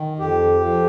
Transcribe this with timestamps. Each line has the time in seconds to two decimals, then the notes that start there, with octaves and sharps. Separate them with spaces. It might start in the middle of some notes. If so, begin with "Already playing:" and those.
Already playing: D#3
0.19 F2 G4
0.60 F2